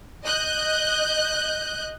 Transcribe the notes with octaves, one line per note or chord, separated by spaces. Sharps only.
D#5 F#6 G6